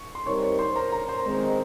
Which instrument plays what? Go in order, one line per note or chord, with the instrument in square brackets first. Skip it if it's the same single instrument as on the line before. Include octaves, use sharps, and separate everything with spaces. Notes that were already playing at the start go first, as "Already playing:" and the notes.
Already playing: [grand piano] C#6
C6
[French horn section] G3 C4 D#4 A#4 [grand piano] C#5 C#6
[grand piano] C#5 C#6
C5 C6
A#4 A#5
A#4 A#5
C5 C6
[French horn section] D#3 G#3 C4